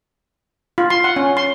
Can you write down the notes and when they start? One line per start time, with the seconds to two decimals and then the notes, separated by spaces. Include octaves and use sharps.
0.78 F4
0.90 C6
1.04 F#5
1.16 C#4
1.37 C6